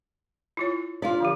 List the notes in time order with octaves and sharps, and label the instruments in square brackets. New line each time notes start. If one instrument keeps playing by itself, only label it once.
[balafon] E4 F4 C#5
[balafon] D4 F5 C6 [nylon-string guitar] F4 D5
[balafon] D3 F3 G4